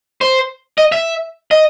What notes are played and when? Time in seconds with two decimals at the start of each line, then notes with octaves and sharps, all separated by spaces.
0.21 C5
0.78 D#5
0.92 E5
1.51 D#5